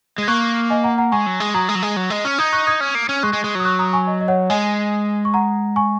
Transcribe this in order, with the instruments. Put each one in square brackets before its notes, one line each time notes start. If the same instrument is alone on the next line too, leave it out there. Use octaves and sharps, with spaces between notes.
[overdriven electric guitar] G#3 [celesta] G#6
[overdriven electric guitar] A#3 [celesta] C#6 F#6
[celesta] D#5 G#5
F#5 A#5
F#5 A#5
[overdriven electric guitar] G#3 [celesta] G#5 C#6
[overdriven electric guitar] F#3
G#3
[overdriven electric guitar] F#3 [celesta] A#5 D#6
[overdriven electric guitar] G#3
F#3
G#3
F#3
G#3
C#4
[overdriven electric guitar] D#4 [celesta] D#6 G#6
[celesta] C#6 F#6
D#6 G#6
[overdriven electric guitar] C#4
A#3
C#4
[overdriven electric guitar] G#3 [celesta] C#6 F#6
[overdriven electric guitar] G#3
G#3
[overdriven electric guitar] F#3 [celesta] D#6
[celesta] C#6 F#6
A#5 D#6
G#5 C#6
D#5
D#5
C#5 F#5
[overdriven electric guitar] G#3 [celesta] D#5 G#5
[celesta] C#6
F#5 A#5
G#5 C#6